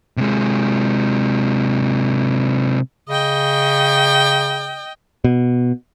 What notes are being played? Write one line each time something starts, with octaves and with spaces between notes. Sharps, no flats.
C3 G#3
C#3 D#5 G5
B2